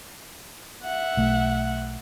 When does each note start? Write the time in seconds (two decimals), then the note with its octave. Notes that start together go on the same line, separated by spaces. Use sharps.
0.84 E5 F#5
1.17 B1 A3